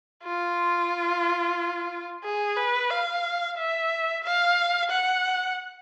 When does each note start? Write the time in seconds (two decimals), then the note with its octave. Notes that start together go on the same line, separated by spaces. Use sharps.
0.24 F4
2.24 G#4
2.57 B4
2.90 F5
3.58 E5
4.24 F5
4.91 F#5